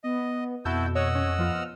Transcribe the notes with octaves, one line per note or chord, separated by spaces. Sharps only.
B3 D#5
F2 B2 E4 F#4 A5 E6 G6
C#5 D#5 F#5 E6
C#4 C#5
F3 B3 F4 F6